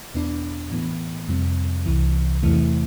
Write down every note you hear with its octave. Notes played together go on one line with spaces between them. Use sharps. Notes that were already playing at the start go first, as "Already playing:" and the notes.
E2 B2 B3 D4
A2 E3 B3
F2 C3 G3 C4
C2 C3 E3
E2 C3 E3 A3